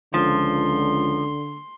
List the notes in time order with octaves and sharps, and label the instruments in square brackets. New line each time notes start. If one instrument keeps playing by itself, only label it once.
[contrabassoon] C#2 [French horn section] D3 [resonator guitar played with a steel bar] F3 [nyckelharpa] C6